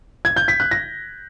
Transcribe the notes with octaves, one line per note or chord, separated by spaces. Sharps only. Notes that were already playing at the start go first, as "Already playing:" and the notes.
G#6
G6
B6
F#6
A#6